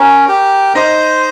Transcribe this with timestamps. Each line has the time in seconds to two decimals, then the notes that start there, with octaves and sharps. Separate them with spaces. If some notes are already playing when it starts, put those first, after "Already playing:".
Already playing: C#4 A#4
0.29 G4
0.75 D#4 C5 D#5